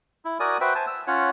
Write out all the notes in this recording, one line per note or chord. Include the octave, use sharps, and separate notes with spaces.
E4
F#4 A#4 D5 G#5 D#6
F#4 B4 C5 E5 G5
C5 G#5 A5
E6
C#4 F4 C#5 F#5